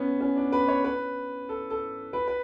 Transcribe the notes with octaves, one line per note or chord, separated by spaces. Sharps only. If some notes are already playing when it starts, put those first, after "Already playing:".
Already playing: B3 C#4
C#4
D4
B4
C#5
B4
A4
A4
B4
B4